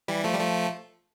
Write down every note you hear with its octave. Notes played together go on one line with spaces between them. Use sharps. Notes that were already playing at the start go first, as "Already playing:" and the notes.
E3 G3
F3 A3
G3
F3 A3